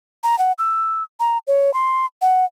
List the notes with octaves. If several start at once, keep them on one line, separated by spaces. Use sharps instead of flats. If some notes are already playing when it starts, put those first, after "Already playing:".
A#5
F#5
E6
A#5
C#5
C6
F#5